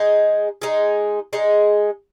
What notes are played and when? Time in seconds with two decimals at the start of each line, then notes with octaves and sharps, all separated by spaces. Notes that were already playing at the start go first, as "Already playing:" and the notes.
Already playing: G#3 D#4 G#4
0.62 G#3 D#4 G#4
1.33 G#3 D#4 G#4